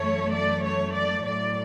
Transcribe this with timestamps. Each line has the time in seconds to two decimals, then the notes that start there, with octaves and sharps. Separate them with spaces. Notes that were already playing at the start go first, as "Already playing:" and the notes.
Already playing: F#2 E3 A3 C#5
0.33 D5
0.63 C#5
0.94 D5
1.25 A2 F#3 A3 D5